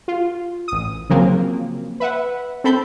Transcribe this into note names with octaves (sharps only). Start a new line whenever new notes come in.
F4
A1 D#6
C#3 F3 F#3 A#3 C4
B4 E5 F#5
C4 A4 B5 G6